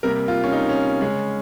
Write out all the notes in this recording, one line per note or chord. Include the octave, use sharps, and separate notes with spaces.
C3 G3 A#3 A#4
F4
C#4
D#4
C#4
C#3 G#3 C#4